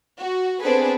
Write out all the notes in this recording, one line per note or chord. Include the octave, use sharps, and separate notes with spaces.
F#4
B3 C4 D4 G#4 A4 B4